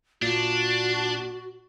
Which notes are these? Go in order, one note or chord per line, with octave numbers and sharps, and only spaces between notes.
G#1 A#2 D4 F#4